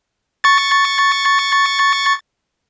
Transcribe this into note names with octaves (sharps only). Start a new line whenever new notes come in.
C#6 A6